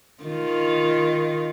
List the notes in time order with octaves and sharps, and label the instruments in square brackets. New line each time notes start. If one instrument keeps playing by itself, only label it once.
[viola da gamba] D#3 F4